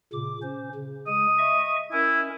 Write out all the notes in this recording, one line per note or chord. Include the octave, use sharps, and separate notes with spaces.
A#2 C#3 D6
C#4 C5
C#3
G#3 D#6
D#5 E5 C#6
C#4 E4 A#4